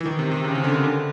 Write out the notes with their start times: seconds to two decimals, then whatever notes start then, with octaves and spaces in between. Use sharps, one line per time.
0.01 E3
0.05 D#3
0.19 C3
0.31 C3
0.44 C#3
0.55 C#3
0.64 D3
0.83 D3